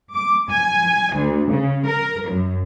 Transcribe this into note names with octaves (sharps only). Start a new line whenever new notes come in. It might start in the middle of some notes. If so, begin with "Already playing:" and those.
D6
G#5
D2
C#3
A#4
F#2